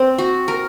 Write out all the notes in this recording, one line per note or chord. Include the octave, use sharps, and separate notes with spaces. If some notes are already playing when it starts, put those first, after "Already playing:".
Already playing: C4
F#4
A#4